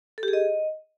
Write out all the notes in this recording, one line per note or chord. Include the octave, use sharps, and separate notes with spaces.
A4
G4
G#4
D#5